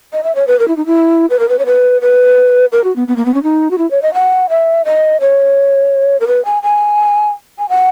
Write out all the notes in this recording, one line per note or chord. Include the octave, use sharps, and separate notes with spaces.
D#5
E5
C#5
B4
A#4
E4
D#4
E4
B4
A#4
B4
C#5
B4
B4
A#4
F#4
B3
B3
A#3
B3
C#4
D#4
F#4
E4
C#5
D#5
F#5
E5
D#5
C#5
A#4
B4
G#5
G#5
G#5
F#5